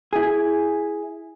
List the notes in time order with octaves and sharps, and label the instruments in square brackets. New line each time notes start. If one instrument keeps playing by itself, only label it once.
[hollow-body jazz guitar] E4 G#4